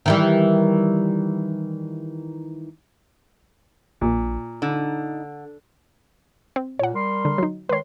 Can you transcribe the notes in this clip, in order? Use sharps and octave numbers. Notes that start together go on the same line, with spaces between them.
D#3 E3 G3
A#1 A#2
D3 D#4
C4
A#2 C#5 F#5
G3 A#4 C6
D3
F#3 D#4
D#3 G#3 B4 C#5 C6